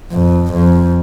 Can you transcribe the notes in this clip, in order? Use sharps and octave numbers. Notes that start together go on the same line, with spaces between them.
F2
F2